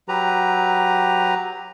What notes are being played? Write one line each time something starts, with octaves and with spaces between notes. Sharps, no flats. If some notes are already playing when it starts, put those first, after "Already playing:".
F#3 G4 B4 A#5